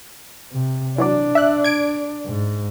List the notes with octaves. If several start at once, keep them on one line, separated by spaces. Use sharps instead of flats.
C3
E3 F#3 D4 D5
E5 F#6
G#6 D7
G#2